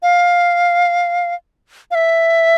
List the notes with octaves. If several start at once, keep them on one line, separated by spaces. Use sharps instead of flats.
F5
F5
E5